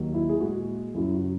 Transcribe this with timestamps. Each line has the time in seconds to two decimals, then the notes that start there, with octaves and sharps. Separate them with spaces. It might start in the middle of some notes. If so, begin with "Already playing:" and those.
Already playing: D#2 D#3 F#3
0.14 E4
0.29 G#4
0.40 A#2 G#3 F#4
0.94 F#2 C#3 F#3 E4
1.14 F#4